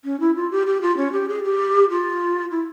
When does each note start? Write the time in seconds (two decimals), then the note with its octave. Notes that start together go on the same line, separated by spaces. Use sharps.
0.05 C#4
0.20 E4
0.36 F4
0.52 G4
0.67 G4
0.82 F4
0.97 C#4
1.12 G4
1.29 G#4
1.44 G4
1.90 F4
2.51 E4